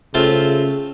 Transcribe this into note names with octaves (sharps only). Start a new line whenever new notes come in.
C#3 A3 C4 F4